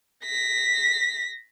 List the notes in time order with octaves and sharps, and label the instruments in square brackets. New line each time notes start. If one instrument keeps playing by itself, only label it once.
[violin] A#6 B6